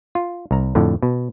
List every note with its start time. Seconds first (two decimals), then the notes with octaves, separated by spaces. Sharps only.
0.15 F4
0.51 C2 A#5
0.75 F2 A2 D3
1.03 B2